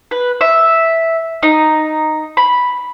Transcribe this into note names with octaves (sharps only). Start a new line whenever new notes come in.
B4
E5
D#4
B5